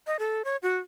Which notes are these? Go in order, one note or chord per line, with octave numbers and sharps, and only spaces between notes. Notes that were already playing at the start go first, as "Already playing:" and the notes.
D#5
A4
C#5
F#4